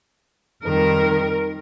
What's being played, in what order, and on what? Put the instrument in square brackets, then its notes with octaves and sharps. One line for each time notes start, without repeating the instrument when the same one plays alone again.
[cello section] F2 D#3 G3 A#4